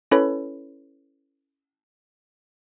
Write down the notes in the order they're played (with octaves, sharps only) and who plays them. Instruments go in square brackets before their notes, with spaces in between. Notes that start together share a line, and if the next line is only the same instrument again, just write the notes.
[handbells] C#4 E4 A4 B4 C#5 B5